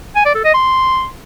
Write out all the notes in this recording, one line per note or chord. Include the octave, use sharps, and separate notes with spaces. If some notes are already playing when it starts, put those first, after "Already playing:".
G#5
D5
A4
D#5
C6